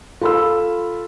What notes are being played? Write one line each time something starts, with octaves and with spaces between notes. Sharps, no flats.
F4 A4 B5 C6 E6